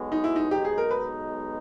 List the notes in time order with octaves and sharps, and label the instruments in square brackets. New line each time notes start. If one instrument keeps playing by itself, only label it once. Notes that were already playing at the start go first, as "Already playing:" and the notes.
Already playing: [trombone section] B1 B2 G#3
[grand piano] D#4
E4
D#4
[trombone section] B1 B2 G#3 D#4 [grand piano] G4
[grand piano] G#4
A#4
B4